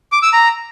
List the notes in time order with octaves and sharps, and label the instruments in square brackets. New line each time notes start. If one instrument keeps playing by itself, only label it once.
[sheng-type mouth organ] D6
E6
A#5